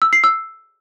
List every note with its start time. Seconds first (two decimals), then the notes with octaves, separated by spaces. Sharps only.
0.02 E6
0.13 C7
0.24 E6